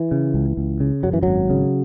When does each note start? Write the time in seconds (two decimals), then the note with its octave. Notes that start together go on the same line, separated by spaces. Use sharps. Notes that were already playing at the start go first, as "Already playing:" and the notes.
Already playing: E3
0.11 C#3
0.34 C#2
0.57 C#2
0.80 C#3
1.03 F#2 F#3
1.13 E3
1.23 G#1 F#3
1.50 C#3